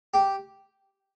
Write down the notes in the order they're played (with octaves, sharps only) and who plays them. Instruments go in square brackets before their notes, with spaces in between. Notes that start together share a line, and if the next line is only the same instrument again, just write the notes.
[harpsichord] G4